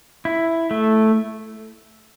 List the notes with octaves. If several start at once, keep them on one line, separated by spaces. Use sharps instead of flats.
E4
A3